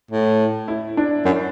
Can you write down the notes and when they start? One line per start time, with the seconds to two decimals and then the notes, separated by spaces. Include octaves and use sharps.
0.11 A2
0.68 E4
0.97 D4
1.26 F#2